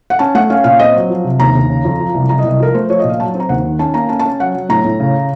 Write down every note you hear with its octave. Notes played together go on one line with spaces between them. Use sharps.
F#5
C#4 A5
A3 F#5
C#4 F5
A#2 F5
C4 D#5
F#3
F3
C3
D#2 A#5
D#2
C#3
F2
F3
C2
C2 A#5
D#5
C2
D#5
F3 A#4
A3 C5
F3 C#5
D#5
A#2
F5
F#3 A5
C4
A#5
D#2 F#5
D#3
C#4 A5
A#3 A#5
C#4 A5
A5
C#4
F#3 F#5
F#3
A2 A#5
A2
C#3